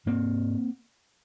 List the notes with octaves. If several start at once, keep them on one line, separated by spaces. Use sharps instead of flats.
G#2 A#3 C4